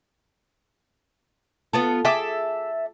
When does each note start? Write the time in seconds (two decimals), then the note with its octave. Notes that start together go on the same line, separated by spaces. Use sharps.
1.73 B3 F4 A4
2.05 G#4 A4 E5 D6